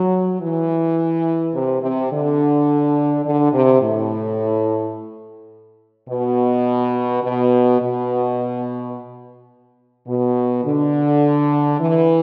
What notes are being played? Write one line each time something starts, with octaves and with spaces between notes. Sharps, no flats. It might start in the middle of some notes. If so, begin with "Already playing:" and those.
Already playing: F#3
E3
C3
C3
D3
D3
C3
A2
B2
B2
B2
B2
D3
E3